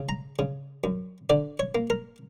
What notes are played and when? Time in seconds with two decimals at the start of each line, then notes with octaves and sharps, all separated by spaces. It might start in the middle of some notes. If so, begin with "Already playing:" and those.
Already playing: C#3
0.09 A#5
0.39 C#3
0.84 F#2
1.30 D3 D5
1.59 C#5
1.75 A#3
1.90 A#4